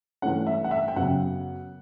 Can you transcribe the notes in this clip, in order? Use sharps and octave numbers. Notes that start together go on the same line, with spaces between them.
G2 E3 A3 C#4 F#5
E5
F#5
E5
G5
F#2 C#3 F#3 B3 F#5